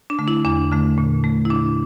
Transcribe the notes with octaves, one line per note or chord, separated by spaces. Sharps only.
D4
D3 A3
E4
E2 D4
D3 A3
A#2
A3
E4
A#2 D4